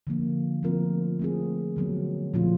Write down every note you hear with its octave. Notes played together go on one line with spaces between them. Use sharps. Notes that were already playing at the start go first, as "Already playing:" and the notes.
D3 F3 A#3
F3 A3 C4 F4 A#4
A3 C4 F4 G#4
D3 F#3 B3
A#2 F3 A3 C#4 F4